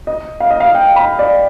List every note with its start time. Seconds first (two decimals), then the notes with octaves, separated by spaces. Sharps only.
0.07 D#5
0.40 F5
0.50 D#5
0.60 F5
0.74 G5
0.96 B5
1.19 D5